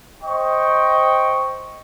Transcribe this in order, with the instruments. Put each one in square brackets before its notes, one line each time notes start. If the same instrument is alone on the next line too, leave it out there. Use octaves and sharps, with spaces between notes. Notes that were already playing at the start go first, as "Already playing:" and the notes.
[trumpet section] C5 D#5 G5 C#6